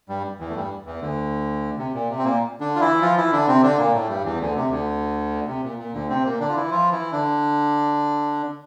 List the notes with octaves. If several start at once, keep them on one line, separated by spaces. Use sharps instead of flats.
G2 G3
E2 E3
A3
G2 G3
E2 E3
D2 D3
C3
A#2
C3
C4
A#2 A#3
D3 D4
F4
E3 E4
F3 F4
E3 E4
D3 D4
C3 C4
D3 D4
A#2 A#3
A2 A3
G2 G3
E2 E3
D2 D3
C3
D2 D3
C3
A#2
A#2
D2 D3
C3 C4
A#2 A#3
D3 D4
F4
E3 E4
F3 F4
E3 E4
D3 D4